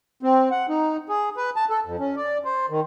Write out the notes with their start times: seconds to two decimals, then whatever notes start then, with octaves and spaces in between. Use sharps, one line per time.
0.23 C4
0.51 F#5
0.69 D#4
1.09 G#4
1.37 B4
1.56 A5
1.70 A4
1.85 F2
2.00 C#4
2.16 D5
2.45 C5
2.70 D#3